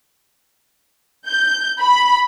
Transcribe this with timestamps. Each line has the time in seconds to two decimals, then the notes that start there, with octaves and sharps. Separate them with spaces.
1.27 G6
1.80 B5